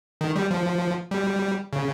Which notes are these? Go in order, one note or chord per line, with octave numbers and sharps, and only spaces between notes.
D#3
G3
F3
G3
C#3